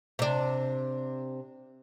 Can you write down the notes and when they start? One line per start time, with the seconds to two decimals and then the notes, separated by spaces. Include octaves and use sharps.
0.19 C3 D4